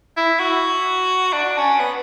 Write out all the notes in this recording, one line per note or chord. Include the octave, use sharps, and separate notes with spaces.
E4
F#4
D4
C#4
B3